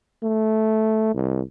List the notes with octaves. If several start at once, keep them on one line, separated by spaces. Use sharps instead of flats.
A3
C2